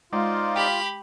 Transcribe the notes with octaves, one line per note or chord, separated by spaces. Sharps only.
G#3 D#4 F4 C5 D5
G4 G5 B5